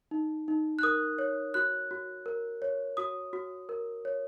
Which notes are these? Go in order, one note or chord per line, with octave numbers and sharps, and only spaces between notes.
D#4
D#4
F#6
A#4 D#6
C#5
F#4 F#6
F#4
A#4
C#5
F#4 D#6
F#4
A#4
C#5